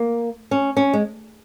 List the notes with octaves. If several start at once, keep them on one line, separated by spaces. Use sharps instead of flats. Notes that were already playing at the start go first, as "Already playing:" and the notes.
Already playing: A#3
C#4
C#4
G#3